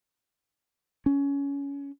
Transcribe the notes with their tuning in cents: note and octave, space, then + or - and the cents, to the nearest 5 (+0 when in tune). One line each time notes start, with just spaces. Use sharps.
C#4 +20